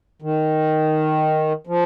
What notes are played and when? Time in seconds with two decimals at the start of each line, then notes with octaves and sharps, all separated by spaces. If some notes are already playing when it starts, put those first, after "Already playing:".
0.22 D#3
1.67 F3